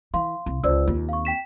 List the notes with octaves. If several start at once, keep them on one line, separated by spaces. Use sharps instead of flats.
E3 F5 C6
C2
C#2 C5 D5 E6
D#2 C4 F4
F5 C#6
G5 B6 E7